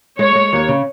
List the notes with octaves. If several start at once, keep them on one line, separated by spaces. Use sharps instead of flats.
G#3 C#5
G#3
D#2
C#3